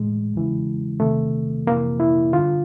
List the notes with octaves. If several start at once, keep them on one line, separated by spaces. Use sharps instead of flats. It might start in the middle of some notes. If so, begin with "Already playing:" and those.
Already playing: A2 E3 G#3
E2 C#3 E3
E2 C3 D#3 A3
F2 C3 E3 A#3
E4
G2 D3 F4